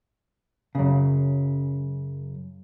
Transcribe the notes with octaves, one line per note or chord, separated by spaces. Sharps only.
F#2 C#3